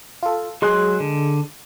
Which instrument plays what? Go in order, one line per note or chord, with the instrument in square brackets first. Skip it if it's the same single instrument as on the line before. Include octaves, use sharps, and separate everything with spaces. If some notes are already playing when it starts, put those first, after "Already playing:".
[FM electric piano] F4 A4
[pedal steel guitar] F#3 C6 F#6 [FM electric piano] G#3 G#4
[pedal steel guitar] D3